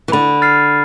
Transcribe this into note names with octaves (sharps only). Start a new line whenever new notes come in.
E3
D3 B5
F6 A6 C7